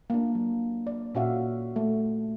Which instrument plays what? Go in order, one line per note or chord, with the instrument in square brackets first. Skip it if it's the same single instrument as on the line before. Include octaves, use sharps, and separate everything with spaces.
[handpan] A#3 D4
F#3
D5
A#2 C#4 F#4 E5 F5
A3